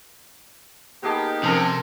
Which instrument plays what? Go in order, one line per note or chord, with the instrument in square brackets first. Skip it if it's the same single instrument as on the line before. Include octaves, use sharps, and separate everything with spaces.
[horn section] A#3 D#4 G4 [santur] B3 G#4 A5
[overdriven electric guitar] C3 [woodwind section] F3 C4 C#4 [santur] A4 A#4